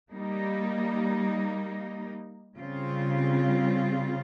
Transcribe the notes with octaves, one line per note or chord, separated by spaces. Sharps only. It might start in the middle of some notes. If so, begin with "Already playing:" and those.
G3 A#3 D#4
C#3 G3 C4 F4